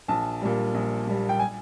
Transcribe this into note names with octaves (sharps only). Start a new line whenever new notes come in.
A#1 A5
A#2 G3
A#1
A#2 G3
G5
G#5